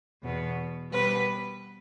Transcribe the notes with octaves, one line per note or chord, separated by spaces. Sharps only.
E2 B2 B3
B2 G3 B3 B4